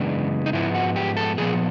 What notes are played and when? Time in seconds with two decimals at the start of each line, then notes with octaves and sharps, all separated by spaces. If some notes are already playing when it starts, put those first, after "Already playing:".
Already playing: F#2 C#3 E3 G#3 B3 D4
0.46 D#4
0.53 G#2 F3 G#3 B3 E4
0.75 F#4
0.96 G4
1.17 A4
1.38 A#2 F3 B3 G#4